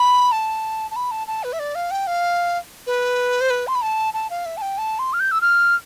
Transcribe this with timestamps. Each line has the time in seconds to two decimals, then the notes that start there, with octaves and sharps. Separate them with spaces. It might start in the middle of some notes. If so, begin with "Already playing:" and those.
Already playing: B5
0.32 A5
0.91 A5
0.96 B5
1.11 A5
1.27 A5
1.44 B4
1.53 E5
1.59 D5
1.75 F5
1.91 G5
2.07 F5
2.87 B4
3.41 C5
3.50 B4
3.67 C6
3.75 B5
3.82 A5
4.14 A5
4.30 F5
4.46 E5
4.57 A5
4.62 G5
4.78 A5
4.99 C6
5.13 F6
5.20 G6
5.31 E6
5.41 F6